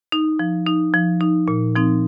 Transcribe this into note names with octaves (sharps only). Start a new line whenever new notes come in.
D#4
F3
D#4
F3
D#4
A#2
F3 C4 D#4